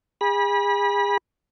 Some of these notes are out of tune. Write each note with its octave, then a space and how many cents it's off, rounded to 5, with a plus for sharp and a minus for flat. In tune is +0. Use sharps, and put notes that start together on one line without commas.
G#4 -35 B5 -30